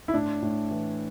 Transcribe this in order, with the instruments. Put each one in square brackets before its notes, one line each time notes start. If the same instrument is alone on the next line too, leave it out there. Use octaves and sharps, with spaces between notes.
[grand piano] E4
A2 D4
A2
E3